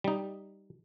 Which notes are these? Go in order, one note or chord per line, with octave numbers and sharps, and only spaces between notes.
G3 D#4